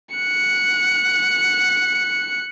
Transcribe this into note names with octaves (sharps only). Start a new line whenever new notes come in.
F#6 C#7